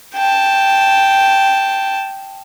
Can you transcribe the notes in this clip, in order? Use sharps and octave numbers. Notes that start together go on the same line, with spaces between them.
G5 A5